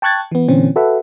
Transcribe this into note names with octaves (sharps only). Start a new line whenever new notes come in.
G5 A5 C#6 F#6 G#6 A6
E3 B3
A#2 D3 E3 C4 C#4
F#4 A4 B4 E5 F#5